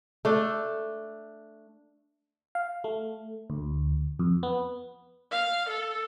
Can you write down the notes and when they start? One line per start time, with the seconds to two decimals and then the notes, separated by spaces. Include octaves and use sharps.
0.25 A3 D4
2.55 F5
2.84 A3
3.50 D2
4.19 F2
4.43 B3
5.31 F5
5.69 A4